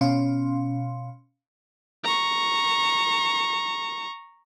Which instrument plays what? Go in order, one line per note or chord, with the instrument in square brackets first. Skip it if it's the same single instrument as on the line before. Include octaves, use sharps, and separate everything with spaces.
[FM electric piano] B2 C#4 F5 C6
[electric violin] A#5 C#6